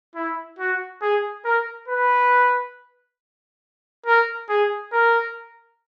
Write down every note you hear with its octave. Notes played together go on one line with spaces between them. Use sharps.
E4
F#4
G#4
A#4
B4
A#4
G#4
A#4